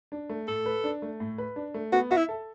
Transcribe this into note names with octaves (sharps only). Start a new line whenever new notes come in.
D4
A3
A2 A4
B4
D4
A3
A2
B4
D4
A3
B3 F#4
F#4 E5
E4
A4